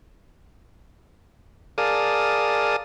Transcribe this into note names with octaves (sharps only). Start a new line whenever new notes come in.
G#4 A#4 D5 F5 A5 D#6